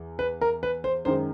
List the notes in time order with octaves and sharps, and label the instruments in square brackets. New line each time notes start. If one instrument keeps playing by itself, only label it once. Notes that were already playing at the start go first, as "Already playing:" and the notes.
Already playing: [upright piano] E2
[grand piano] B4
A#4
B4
C5
[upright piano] F#2 D#3 G#3 [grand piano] C5